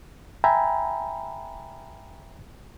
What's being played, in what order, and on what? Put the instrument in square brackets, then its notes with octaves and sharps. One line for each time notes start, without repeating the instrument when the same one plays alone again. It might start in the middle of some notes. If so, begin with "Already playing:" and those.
[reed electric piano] E5 G5 G#5 A#5 B5